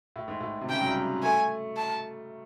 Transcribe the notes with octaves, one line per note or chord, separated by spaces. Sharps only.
A2
G#2
A2
C3
C#3 G5
F#3
G3
A3 G#5
A5